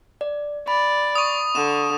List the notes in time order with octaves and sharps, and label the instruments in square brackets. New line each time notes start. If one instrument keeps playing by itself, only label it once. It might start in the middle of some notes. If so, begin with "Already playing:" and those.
[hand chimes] D5
[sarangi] D5 [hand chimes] B5
[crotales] C#6 D#6
[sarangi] D3 [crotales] E7